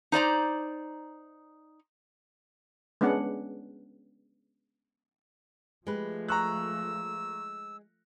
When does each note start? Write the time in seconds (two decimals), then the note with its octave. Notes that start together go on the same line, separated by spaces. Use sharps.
0.12 D#4 C5 D5 A#5
3.01 G#3 B3 C#4 D4 F#5
5.87 F3 G#3 A3 G4 B4
6.28 A#5 C#6 E6 F#6